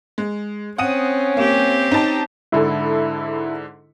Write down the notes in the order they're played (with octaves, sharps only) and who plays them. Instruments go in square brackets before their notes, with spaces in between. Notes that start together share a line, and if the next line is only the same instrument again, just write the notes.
[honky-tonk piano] G#3
[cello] C4 [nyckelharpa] C#4 [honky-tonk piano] F#5 D#6 D#7
[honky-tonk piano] A#3 [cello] C4 G4
[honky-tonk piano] D#4 A5
[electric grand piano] G#2 D3 [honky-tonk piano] E4 A4